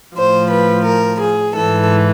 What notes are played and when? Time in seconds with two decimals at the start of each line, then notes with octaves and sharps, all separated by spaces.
0.16 A2 F3 C5
0.50 B4
0.85 A#4
1.20 G#4
1.55 G#2 E3 A4